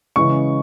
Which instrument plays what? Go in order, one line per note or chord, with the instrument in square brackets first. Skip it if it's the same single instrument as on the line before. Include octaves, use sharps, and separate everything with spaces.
[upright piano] C#3 E3 G#3 C#6